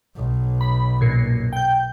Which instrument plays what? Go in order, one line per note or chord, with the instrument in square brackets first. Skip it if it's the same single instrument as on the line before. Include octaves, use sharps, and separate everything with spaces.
[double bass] B1
[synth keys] B5
F#2 A#2
G5 G6